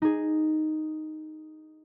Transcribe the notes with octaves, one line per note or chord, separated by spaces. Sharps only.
D#4 G#4